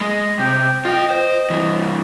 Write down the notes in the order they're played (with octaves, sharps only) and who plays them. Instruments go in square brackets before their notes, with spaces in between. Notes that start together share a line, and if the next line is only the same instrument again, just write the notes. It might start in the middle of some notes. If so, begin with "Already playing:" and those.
[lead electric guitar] G#3 [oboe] D#5
[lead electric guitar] C3 [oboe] G5
[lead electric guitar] F4 G5 [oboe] D#5
[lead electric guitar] C5
G2 E3